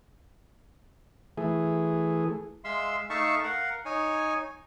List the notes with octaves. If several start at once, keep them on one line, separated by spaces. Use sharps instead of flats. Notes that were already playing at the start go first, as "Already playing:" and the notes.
E3 A3 G#4
G#3 E5 F5 C6 E6
A3 D#4 E5 F5 A5 C#6
A#4 F5 F#5
D#4 C#5 G#5